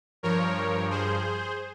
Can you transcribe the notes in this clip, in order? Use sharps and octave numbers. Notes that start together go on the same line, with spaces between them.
G2 F3 A#4 C#5
G#4 C5